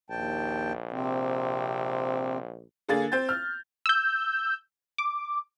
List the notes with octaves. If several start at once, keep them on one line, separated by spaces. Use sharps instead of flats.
A#1 D#2 G5 A5
C3 C4
D3 A#3 G#4 A6
C4 G6 A6
F6
E6 G6
D6